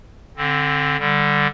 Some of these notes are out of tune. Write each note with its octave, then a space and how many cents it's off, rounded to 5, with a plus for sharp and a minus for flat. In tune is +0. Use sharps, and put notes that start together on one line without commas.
D3 -10 C4 +15
D3 +0 G3 +0